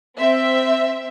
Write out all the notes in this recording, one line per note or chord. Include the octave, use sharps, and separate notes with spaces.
C4 E5